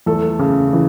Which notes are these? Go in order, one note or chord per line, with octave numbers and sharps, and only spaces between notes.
E2 A3 A4
C#3
E3